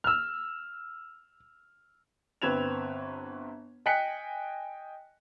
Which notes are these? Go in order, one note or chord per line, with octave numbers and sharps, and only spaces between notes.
E6 F6
G1 C4 B4 G#6 E7 F7
D#5 G5 G#5 F#6 B6 C#7